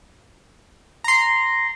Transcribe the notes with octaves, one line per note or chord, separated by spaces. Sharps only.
A#5 C6